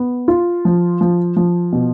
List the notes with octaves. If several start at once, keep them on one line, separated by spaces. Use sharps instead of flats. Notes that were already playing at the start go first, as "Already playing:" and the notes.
Already playing: B3
F4
F3
F3
F3
B2